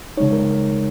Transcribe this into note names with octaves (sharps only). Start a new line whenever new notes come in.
C#3 G#3 D#4 C#5
A#4